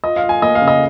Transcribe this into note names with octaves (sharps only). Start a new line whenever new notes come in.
F4 D#5
F5
F4
G#5
A#3 D#5
F5
C#3
D#5